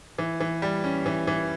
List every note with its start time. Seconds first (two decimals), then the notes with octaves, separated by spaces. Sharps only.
0.18 E3
0.40 E3
0.62 G3
0.84 C#4
1.06 E3
1.27 E3